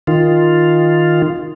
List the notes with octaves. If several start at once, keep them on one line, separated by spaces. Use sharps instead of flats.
D#3 F4